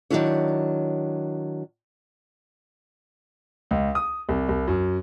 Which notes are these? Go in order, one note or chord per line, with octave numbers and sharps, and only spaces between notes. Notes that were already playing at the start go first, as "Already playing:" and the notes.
D#3 E3 F#3 D4 E4 C#5
C#2
D#6
C2
C2
F#2